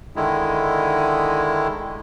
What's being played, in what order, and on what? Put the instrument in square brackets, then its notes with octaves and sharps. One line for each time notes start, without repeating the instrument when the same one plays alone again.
[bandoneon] D3 D#3 G#3 E4